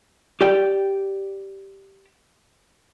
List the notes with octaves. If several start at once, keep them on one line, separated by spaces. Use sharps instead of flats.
G4 D5 G5